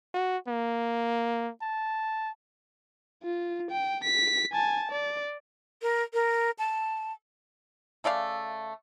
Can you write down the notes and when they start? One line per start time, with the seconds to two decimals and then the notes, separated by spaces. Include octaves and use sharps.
0.14 F#4
0.48 A#3
1.62 A5
3.23 F4
3.71 G5
4.04 B6
4.53 G#5 A5
4.91 D5
5.82 A#4
6.13 A#4
6.59 A5
8.04 C#3 A3 D5 F5